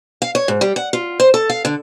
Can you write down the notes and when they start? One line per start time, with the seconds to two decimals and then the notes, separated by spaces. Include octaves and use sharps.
0.22 F5
0.35 C#5
0.48 G#2
0.61 G3
0.76 F#5
0.93 F4
1.20 C5
1.34 A4
1.50 F5
1.65 D3